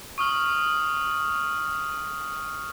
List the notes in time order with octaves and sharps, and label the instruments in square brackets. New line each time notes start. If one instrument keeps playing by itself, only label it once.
[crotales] C#6 D#6 F6 F#7